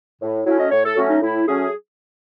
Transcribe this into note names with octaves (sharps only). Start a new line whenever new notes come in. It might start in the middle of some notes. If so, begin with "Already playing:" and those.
A2
F#3 A3 C#4 E4
D#5
A2 C#5
A4
F#3 A3 C#4 F#4
D#4
A2 E4
F#3 A3 C#4 G#4